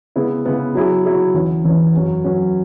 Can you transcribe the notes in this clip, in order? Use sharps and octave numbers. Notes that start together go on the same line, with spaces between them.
C#3 G#3 B3 E4
C#3 G#3 B3 E4
F#3 E4 G#4
F#3 E4 G#4
E2 E3 C#4
E2 E3 C#4
F#2 F#3 C#4 F#4 B4
F#2 F#3 C#4 F#4 B4